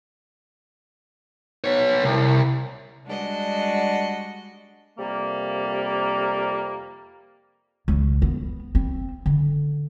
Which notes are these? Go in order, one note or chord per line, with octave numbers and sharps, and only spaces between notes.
B3 C#5
C2
G3 G#3 D4 F#4 D#5
F2 C3 G3 A#3
C#2
B3
C4
D3